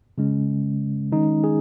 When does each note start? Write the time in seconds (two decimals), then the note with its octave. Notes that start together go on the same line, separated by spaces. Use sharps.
0.18 C#3 G#3 C#4
1.12 D#3 G#3 C#4 D#4
1.44 G#4